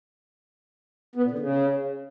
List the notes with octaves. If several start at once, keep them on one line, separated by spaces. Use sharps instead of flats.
B3
A#2
D3
C#3